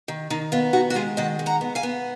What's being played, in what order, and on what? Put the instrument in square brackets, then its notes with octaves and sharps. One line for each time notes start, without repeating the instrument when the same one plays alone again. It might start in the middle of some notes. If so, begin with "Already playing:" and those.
[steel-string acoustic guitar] D#3
D#3 D#4
B3 F4
D#3 D#4 F#4
F#4
G#3 F4 G#4
D#3 D#5 F#5
G#3
F#5 A#5
B3
F5 G#5
B3